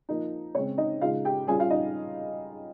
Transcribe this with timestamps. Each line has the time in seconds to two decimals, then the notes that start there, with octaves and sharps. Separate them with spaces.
0.09 F3 A#3 D#4
0.54 C#3 G#3 C4 C#5
0.78 D#4 D#5
1.01 C#3 G#3 D#4 F4 F5
1.25 G4 G5
1.47 G3 C#4 F4 G#4 G#5
1.59 F4 F5
1.70 D#4 D#5